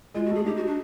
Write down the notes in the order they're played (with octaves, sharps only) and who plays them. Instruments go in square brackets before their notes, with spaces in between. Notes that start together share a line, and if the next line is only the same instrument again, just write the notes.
[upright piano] G#3 [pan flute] F4
[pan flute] F#4
[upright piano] A3 [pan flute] G#4
[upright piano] D#4 [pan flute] G4
[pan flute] F#4
D4